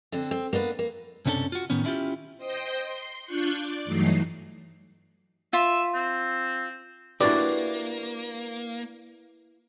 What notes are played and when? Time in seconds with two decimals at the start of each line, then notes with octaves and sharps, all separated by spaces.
0.12 D3 C4 D4
0.31 C4
0.53 A#3 B3 D4 B4
0.79 A#3
1.26 B1 F#2 C3 C#4 D4 A4
1.52 F4 F#4
1.70 A2 D#3 B3 C#4
1.84 C#4 D4 E4 F4 G4
2.37 C5 D#5 G5
2.77 C6
3.24 D4 F4 C#6 F#6 G6 C#7
3.54 D5
3.85 G2 E3 F#3 A3 D#4 C7
5.53 F4 E5
5.95 C4
7.21 A#3 D4 E4 F#4 G4 B4 D5